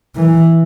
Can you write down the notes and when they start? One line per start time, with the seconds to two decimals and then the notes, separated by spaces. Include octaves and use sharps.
0.15 E3